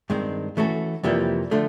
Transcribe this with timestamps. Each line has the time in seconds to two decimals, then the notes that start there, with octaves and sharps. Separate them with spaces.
0.10 G2 D#3 G#3 C4
0.57 E3 A3 C#4 F#4 A4
1.03 F2 C3 E3 G3 A#3
1.51 D3 F3 A3